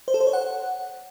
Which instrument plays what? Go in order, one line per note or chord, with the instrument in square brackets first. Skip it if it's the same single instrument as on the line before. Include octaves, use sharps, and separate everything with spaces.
[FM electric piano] C5
A4
C5
C#5
F#5